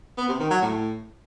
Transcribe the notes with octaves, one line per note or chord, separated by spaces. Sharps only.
B3
C3
D#3
F#3
A2